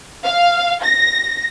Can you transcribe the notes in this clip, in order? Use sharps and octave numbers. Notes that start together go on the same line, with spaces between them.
F5
A#6